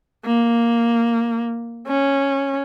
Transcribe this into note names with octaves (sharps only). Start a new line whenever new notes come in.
A#3
C#4